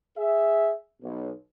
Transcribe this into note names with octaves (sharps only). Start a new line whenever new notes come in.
G#4 E5
B1